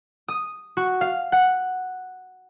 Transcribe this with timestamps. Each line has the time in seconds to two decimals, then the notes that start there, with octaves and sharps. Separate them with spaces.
0.28 D#6
0.77 F#4
1.01 F5
1.32 F#5